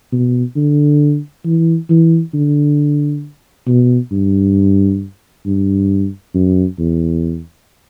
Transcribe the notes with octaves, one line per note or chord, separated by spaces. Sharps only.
B2
D3
E3
E3
D3
B2
G2
G2
F#2
E2